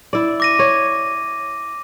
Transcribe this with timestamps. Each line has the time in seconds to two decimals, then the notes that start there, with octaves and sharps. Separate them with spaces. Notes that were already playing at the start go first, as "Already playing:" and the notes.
0.13 E4 D5
0.40 D6 A#6 D#7
0.59 C#5